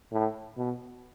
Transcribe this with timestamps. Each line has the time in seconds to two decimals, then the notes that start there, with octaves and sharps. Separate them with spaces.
0.12 A2
0.57 B2